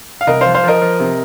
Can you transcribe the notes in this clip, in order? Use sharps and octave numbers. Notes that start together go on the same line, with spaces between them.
F5
C2 A#4 D#5
F3 C5 F5
C5 F5
F3 A#4 D#5
F3
C3